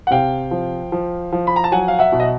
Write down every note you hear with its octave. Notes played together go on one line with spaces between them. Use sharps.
F#5
C3 F5 G5
F3
F3
F3
B5
A#5
A5
F#3 F#5 G#5
F5
E5 F#5
B2
D#5